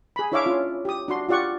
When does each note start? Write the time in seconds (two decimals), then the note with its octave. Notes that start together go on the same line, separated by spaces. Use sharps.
0.16 G#4 B5
0.32 D4 E4 C#5 E5 F5 D6
0.46 C#4 F4
0.85 G4 D#6
1.08 D4 F#4 C6
1.29 F4 G4 D5 F#5 C#6